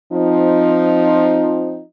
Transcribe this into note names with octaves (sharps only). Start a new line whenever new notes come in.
F3 C4 D#4